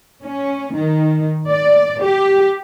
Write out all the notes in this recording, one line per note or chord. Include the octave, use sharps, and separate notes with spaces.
C#4
D#3
D5
G4